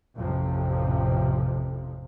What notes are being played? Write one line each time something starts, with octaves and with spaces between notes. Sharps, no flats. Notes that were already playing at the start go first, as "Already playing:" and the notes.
A1 F2 C3 F3